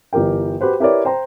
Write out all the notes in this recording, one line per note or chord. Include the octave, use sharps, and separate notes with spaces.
G1 E3 G4 A#4 G5
F#4 G4 B4 C5
E4 G4 A#4 B4 C#5 D5
C5 G5 A#5